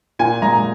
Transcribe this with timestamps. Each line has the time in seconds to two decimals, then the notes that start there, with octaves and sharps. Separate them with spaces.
0.19 A#2 G#5
0.42 G#3 A#5